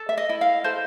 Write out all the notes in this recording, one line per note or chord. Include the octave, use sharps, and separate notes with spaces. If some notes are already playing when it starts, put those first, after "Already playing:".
Already playing: A4
E5
D#5
E4
F5
A4 C5